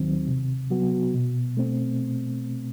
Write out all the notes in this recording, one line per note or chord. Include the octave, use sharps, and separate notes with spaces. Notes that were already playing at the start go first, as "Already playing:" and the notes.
Already playing: D#2 D#3 F#3 C4
C3
F#3 B3 F#4
B2
A3 C4